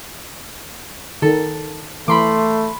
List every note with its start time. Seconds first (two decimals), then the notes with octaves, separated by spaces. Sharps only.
1.22 D#3 A4
2.08 E3 A3 B5 C6 D6